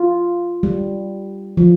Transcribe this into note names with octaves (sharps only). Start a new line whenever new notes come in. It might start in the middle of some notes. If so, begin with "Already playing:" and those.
Already playing: F4
G3
F3